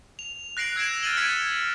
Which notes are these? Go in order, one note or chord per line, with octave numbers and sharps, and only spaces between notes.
F7
F#6 A#6 C7 D7 F7 F#7
E6 G#6 C7 D7 E7
F6 A6 D#7 F#7 G7
G#6 B6 C#7 D7